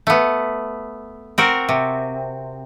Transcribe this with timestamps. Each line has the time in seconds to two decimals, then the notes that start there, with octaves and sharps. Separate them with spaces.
0.07 A3 B3
1.38 C4 F#4 A#4
1.69 C3